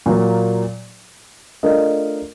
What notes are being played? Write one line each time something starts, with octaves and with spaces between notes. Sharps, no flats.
A#2 F#3 A#3
A3 D4 F4 A#4 D#5